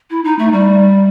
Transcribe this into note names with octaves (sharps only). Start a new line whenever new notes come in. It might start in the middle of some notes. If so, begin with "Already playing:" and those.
E4
D#4
A3
G3